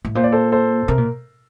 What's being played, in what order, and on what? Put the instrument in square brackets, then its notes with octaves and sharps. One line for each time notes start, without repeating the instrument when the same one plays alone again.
[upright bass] A2
[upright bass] A#2 [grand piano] C5
[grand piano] D5
A4 C5
A4 C5
[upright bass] C3 [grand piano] A#4
[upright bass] A#2